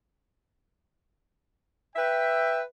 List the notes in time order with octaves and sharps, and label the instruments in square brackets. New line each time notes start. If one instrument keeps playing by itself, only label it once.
[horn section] B4 E5 G5